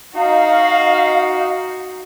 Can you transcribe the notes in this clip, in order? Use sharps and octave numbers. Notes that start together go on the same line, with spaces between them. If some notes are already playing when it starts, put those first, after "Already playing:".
D#4 F#4 F5